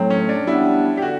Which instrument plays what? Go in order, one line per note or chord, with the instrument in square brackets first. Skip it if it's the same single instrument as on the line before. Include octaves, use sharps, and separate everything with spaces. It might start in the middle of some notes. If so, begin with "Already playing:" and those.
Already playing: [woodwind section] A2 F#3 A3 [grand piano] C4
[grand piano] C#4
D4
[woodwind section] G3 B3 D4 [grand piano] E4
[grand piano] G4
[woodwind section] D3 [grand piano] F#4